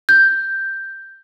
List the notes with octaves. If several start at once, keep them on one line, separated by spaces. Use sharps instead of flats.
G6